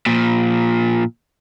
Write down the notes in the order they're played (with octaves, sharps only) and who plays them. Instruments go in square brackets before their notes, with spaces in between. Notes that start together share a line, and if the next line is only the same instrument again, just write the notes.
[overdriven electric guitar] A#2 F3